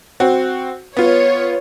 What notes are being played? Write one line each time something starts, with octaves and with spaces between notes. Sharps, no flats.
C4 F#4
B3 F4 C#5